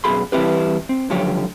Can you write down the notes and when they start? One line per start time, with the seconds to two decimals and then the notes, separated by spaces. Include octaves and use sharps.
0.04 F#2 B2 G#4 B5 C6
0.32 E3 G3 C4 E4 G4 B4
0.89 C4
1.10 C#2 D3 F3 F#3 G4 C#5